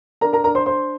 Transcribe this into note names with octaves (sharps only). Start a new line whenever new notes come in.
D4 A#4 A#5
A#4 A#5
D4 A#4 A#5
C5 C6
D4 C5 C6